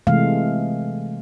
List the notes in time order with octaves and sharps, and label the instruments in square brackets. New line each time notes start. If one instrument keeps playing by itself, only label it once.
[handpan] C3 E3 G#3 A3 F5